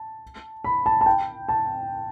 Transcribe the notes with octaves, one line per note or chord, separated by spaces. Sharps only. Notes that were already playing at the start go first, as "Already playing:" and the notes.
Already playing: A5
B5
A5
A5
G5
A5